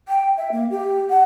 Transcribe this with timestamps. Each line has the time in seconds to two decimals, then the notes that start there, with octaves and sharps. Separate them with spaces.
0.08 G5
0.37 E5
0.52 A#3
0.71 G4
1.10 F#5